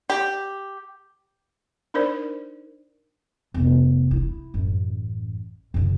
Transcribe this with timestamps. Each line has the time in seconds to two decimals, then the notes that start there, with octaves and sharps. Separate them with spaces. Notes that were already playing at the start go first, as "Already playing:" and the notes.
0.10 G4
1.94 D4 D#4 A#4 C5 D5
3.54 F1 B3
4.11 E4
4.54 A1 F#2
5.74 F#2 C#3